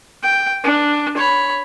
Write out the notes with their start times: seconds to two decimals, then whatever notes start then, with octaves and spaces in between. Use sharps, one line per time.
0.23 G5
0.63 D4
1.17 C#5 B5